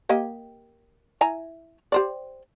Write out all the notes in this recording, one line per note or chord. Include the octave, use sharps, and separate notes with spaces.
A#3 G4 D#5
E4 G#5 A#5
G4 C5 D5